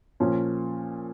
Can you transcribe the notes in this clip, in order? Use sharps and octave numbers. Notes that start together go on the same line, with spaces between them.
A#2 F3 C#4